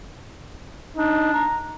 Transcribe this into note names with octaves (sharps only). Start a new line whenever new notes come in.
D4 D#4
A#5